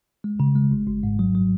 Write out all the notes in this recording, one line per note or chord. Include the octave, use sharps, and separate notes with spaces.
G#3
C#3
G#3
G#1
G#1
G#2
F#3
F#3